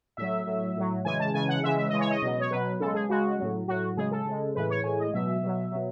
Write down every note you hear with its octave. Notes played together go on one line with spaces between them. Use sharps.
A2 F#3 E5
A2 F#3
A2 F#3
C#3 E3 G#3 G#5
A5
C#3 E3 G#3 G#5
F#5
C#3 E3 G#3 E5
E5
C#3 E3 G#3 D#5
C#5
D#5
B2 F#3
C#5
B2 F#3 B4
C#3 G#3 A4
G#4
C#3 G#3 F#4
A2 F#3
A2 F#3 F#4
C#3 G#3 G#4
A4
C#3 G#3
A2 E3 G#3 B4
C#5
A2 E3 G#3 G#5
D#5
B2 F#3 E5
B2 F#3
B2 F#3